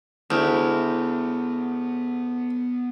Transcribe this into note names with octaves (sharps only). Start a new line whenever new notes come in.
D2 G#3 B3 E4 C#5 G5